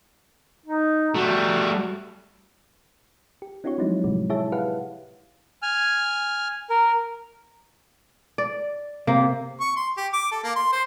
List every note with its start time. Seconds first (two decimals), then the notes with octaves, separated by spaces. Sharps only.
0.66 D#4
1.15 G3 A3 F#4
3.42 G4
3.64 C4 D4 E4 F#4 G4 C#5
3.78 F3 F#3 G#3 C4 D#4 E4
4.04 A2 C3 F3 G#3
4.30 E4 G#4 C#5 E5 A5
4.52 G4 G#4 B4 F5 F#5
5.62 G#5 F6
6.70 A#4
8.38 D5
9.07 C3 A#3
9.61 C#6
9.76 C6
9.98 G4
10.13 D6
10.32 A4
10.44 A#3
10.56 C6
10.72 C5